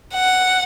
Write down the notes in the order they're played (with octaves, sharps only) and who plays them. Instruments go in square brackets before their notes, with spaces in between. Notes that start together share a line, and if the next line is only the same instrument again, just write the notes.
[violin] F#5